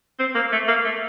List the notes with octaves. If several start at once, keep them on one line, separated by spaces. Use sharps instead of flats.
C4
A#3
A3
A#3
A3